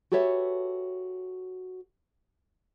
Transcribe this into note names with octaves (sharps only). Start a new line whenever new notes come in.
F#4 G4 A4 B4 C#5 E5